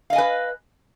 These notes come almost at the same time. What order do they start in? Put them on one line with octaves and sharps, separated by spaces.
F5 D#5 G#5 B4